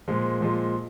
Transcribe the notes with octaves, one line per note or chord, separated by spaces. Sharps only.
A#2 F3 G#3
A#2 F3 G#3